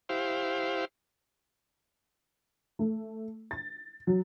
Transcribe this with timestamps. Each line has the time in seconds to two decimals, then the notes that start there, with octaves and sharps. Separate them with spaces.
0.09 E4 G4 C5 F5
2.79 A3
3.51 A6
4.07 F#3